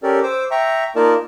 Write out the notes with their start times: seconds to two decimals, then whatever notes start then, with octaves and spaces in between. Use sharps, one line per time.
0.03 C#4 G4 A4 A#4 D5
0.23 C5 D6 E6
0.51 E5 G5 A#5 C#6
0.96 A#3 D#4 F4 A#4 D5 A5